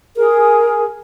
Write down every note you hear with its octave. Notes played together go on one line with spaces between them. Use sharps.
G#4 A#4